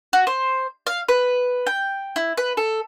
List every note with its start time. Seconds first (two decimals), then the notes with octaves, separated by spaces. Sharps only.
0.13 F#4
0.27 C5
0.87 F5
1.09 B4
1.67 G5
2.16 E4
2.37 B4
2.57 A4